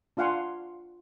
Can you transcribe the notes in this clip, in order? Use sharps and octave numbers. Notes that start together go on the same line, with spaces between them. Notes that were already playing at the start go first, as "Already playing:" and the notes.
D4 F4 F5 F#5 G#5 C6